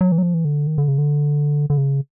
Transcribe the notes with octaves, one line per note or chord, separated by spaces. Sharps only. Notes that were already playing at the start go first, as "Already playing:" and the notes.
F#3
E3
F#3
F3
E3
D3
D#3
D3
C#3
D3
D3
C#3